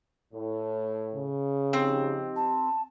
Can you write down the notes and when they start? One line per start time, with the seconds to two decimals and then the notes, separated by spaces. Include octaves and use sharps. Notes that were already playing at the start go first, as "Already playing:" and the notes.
0.34 A2
1.15 C#3
1.73 F3 C4 D#4 G4
2.36 A5